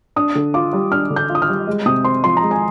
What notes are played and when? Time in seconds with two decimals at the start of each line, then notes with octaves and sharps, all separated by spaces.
0.16 D4 D#6
0.35 D3
0.54 F4 D6
0.73 G3
0.92 D4 F6
1.10 D3
1.16 G6
1.29 F4
1.35 D#6
1.42 F6
1.48 G3
1.67 G#3
1.86 C3 D#6
2.05 C4 C6
2.24 F3 C6
2.37 A#5
2.43 G#3
2.51 G#5